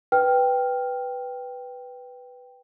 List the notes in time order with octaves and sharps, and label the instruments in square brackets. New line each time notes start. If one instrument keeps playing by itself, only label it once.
[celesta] B4 G5 F6